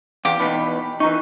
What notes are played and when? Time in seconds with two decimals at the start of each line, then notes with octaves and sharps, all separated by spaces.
0.25 E2 G4 F5
0.40 E2 B2 D#4 B5 B6
1.00 E3 D#4 A#5 C#6